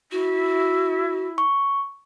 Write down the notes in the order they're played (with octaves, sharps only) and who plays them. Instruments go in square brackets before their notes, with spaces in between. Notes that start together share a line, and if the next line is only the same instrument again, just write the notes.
[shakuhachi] E4 [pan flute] F#4
[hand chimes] C#6